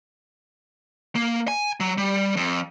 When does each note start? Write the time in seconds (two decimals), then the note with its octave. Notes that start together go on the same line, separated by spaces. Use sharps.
1.16 A#3
1.48 G#5
1.80 F#3
1.98 G3
2.37 F2